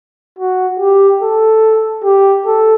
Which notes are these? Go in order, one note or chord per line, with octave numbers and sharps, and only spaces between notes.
F#4
G4
A4
G4
A4